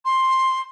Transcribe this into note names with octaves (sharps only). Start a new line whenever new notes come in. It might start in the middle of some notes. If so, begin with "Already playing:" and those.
C6